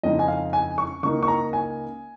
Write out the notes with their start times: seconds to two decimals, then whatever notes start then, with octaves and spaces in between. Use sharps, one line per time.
0.03 F2 C#3 G#3 D#4 D#5
0.19 G#5
0.28 F5
0.53 G#5
0.78 C#6
1.03 C#2 C#3 A#3 D#4 C#6
1.23 C#6
1.28 A#5
1.53 G#5